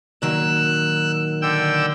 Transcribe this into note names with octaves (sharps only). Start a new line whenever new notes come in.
A#2 D#3 F#3 E6 F#6
D3 G5 E6